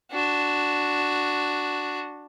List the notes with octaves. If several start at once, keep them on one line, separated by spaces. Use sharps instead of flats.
D4 F#4